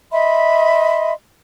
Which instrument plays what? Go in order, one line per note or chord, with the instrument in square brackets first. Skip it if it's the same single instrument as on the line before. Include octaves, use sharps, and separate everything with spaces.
[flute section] D#5 E5 B5 C6